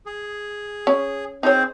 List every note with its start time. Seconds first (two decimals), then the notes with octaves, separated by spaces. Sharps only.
0.06 G#4
0.87 C#4
1.43 C4 D#4 G#4 C5 C#5